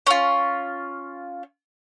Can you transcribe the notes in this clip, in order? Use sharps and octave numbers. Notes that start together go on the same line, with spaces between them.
C#4 F4